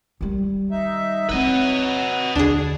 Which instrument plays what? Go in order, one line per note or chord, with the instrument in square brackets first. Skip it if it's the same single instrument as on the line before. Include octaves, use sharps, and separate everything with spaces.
[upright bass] D#3 G3
[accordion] D#4 E5
[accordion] F#3 [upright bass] C4 D#4 [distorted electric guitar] B4 D#5
[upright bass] D#2 D3 [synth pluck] D4 G#4